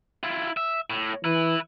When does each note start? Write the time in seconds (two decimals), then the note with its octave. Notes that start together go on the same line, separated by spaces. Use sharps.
0.23 E4 F4
0.57 E5
0.90 A2
1.24 E3 E4 B4